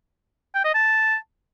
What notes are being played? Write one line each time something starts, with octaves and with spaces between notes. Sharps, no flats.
G5
D#5
A5